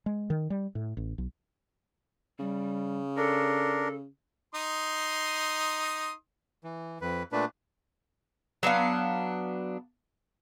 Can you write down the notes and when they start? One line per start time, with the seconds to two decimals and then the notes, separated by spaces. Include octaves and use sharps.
0.06 G#3
0.30 D#3
0.50 G3
0.75 A2
0.97 A1
1.18 B1
2.39 C#3 G3
3.17 D4 A4 A#4
4.55 D#4 C6 D#6
6.64 E3
7.01 F2 B4
7.32 A#2 A3 D4 B4
8.63 F#3 B3 D4 F5